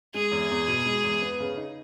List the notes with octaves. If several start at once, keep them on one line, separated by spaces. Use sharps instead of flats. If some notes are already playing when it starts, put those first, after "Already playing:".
G#3 G#4
E2
E2
B2
G#3
E2
B3
C#3
D#4